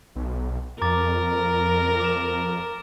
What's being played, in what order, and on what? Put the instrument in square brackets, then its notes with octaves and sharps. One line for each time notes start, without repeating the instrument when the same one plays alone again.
[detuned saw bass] B1
[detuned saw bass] F2 [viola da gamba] A#4 [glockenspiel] A#5 D6 A6
[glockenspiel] D6 E7